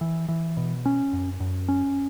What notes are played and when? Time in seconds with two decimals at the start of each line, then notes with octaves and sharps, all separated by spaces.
0.01 E3
0.28 E3
0.57 B2
0.86 C#4
1.13 F#2
1.40 F#2
1.68 C#4